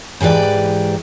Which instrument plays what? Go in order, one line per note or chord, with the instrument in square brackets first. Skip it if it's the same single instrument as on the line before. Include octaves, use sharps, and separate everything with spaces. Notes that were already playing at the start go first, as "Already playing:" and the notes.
[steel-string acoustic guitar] G#2 E3 G4 B4 D5